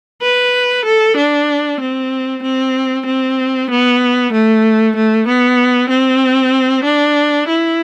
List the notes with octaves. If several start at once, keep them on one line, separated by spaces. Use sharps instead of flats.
B4
A4
D4
C4
C4
C4
B3
A3
A3
B3
C4
D4
E4